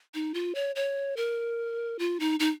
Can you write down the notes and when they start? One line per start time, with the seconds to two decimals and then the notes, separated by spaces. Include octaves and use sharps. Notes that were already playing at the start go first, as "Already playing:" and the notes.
0.14 D#4
0.34 F4
0.55 C#5
0.76 C#5
1.17 A#4
1.99 F4
2.20 D#4
2.40 D#4